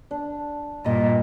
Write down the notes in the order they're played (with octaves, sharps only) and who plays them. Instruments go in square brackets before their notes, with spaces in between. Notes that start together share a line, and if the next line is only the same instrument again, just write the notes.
[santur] D4
[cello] G2 A#2 [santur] D#5